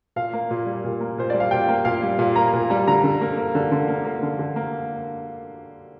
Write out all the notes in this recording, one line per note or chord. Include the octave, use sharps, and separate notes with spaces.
A#2 F5
A#3
A#2
G3
A#2
A#3
A#2 C5
G3 D5
F5
A#2 G5
A#3
A#2 F5
G3
A#2 F5
A#3 A#5
A#2
G3 A#5
D3 A#5
D3
A#3
A#3
D3
D3
A#3
A#3
D3
D3
A#3